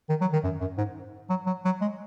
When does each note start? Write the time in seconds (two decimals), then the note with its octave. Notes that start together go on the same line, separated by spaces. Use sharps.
0.09 D#3
0.21 F#3
0.33 D#3
0.44 F#2
0.60 F#2
0.78 G#2
1.30 F#3
1.46 F#3
1.65 F#3
1.81 G#3